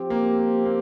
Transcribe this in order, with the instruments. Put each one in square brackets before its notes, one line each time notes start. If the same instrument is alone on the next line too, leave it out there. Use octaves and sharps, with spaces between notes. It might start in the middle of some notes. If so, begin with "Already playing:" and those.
Already playing: [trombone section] F3 C4 G4
[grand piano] A#3
A#3